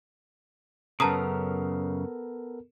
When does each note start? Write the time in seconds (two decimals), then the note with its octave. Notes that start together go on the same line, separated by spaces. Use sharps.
1.00 F#2 C#3 B3 A4 A#4 A5 A#5 D#6